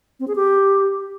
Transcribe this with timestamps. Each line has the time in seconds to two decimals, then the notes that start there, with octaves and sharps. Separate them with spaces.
0.20 C4
0.28 G#4
0.36 G4